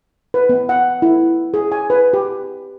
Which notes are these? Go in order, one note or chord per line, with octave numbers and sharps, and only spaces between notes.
B4
B3
F#5
E4
G#4
G#5
B4
G4